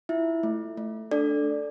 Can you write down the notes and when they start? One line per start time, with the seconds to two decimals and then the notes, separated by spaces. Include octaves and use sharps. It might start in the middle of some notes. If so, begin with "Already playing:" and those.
0.09 E4 F4 E5
0.43 A3
0.77 A3
1.11 D4 A4 D5